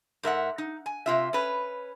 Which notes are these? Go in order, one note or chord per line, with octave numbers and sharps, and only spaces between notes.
G#2 A#4 E5 F#5
D#4
G#5
C3 F4 E5
C#4 B4